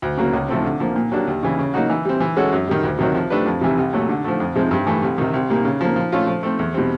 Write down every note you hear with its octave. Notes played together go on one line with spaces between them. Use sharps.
D2
C#3 F#3 A#3
C#2
C3 F3 A3 C4
D3
F3 A#3
A#2
F#3 A#3 D4 G4
D#2
C#3 E3
C#3
F#3 A#3 D#4 F#4
E3
G3 C4
E3
G#3 C#4 F#4 A4
F#2
D#3 G3
D2
C3 D#3 F#3
F3
A3 D4 G4 B4
F2
C3 E3 G3
C2
A#2 F#3 A3
D3
F3 A3
F2
C3 F3 G#3 C4
G2
E3 A3
C2
C3 D#3
C2
A#2 G3 A#3
C#3
F3 A#3
F3
A3 C#4 F4
F3
A3 C4
E2
B2 G3 C4